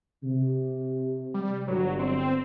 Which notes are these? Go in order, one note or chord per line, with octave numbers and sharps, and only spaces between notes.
C3
G3
G1 F#3
C4